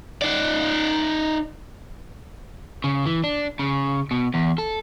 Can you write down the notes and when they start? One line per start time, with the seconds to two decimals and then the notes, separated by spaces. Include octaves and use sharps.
0.22 D#4 D5
2.84 C#3
3.06 E3
3.24 D4
3.59 C#3
4.11 B2
4.34 E2
4.58 A4